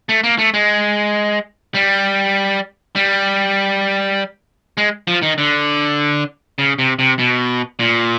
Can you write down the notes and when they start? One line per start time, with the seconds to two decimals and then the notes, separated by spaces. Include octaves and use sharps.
0.09 A3
0.24 A#3
0.38 A3
0.54 G#3
1.75 G3
2.96 G3
4.77 G#3
5.08 F3
5.22 D#3
5.38 D3
6.58 C#3
6.79 C3
6.99 C3
7.19 B2
7.79 A#2